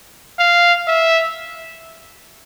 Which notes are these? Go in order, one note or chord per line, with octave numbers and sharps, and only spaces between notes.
F5
E5